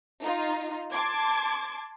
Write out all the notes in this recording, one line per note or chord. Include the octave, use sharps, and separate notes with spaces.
D#4 F4
A5 C6 D6 G#6